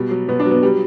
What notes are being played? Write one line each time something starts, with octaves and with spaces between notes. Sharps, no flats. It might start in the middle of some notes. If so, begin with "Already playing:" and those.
Already playing: B2 G3
F#3
B2 B3
D4
F#3
B3
G3